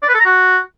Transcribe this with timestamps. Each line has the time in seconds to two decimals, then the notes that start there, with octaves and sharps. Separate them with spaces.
0.02 D5
0.08 B4
0.14 A4
0.20 A#5
0.26 F#4